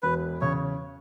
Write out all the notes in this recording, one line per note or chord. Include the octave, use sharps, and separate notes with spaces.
E1 B4
E2 C#3 C#5